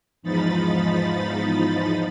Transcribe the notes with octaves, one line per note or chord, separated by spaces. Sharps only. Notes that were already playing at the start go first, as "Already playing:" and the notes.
E2 G#2 F3 D#4 B5 A6